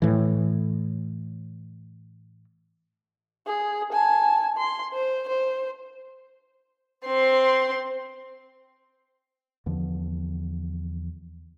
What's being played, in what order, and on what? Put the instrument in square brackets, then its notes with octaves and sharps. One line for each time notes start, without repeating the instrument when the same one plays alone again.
[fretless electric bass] A2 E3
[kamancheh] G#4
G#5 A5
C6
C5
C5
[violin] C4 C6
[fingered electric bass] E2 D3 F3